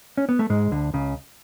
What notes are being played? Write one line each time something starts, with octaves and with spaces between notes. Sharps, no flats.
C#4
B3
A3
G#2 G#3
D2 D3
C#2 C#3